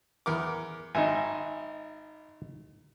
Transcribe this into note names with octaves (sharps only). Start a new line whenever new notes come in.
E2 A#4 D6
G#1 D#4 E5 G#5